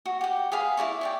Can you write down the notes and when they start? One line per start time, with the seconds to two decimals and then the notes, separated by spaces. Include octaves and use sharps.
0.05 F#4
0.21 G4 F#5
0.52 G#4 B4 F5 B5
0.77 E4 A#4 D5 C#6
1.01 C#5 D5 G5